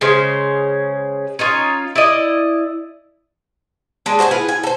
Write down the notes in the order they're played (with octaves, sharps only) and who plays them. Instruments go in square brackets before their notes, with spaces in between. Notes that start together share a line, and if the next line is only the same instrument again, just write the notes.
[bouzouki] C#3 G#3 C#4 C5
C#4 D#4 F4
E4 D5 D#5
G#3 D4
F#4 C5 D#5 G#5
E4 F4 G#4 B4
G#5
A4 C5